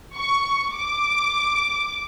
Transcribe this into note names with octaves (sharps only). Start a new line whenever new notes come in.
C#6
D6